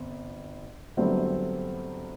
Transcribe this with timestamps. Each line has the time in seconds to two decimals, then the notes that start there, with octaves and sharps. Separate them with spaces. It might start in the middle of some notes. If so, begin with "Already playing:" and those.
Already playing: G1 C4
0.97 G1 G2 F#3 A3 C4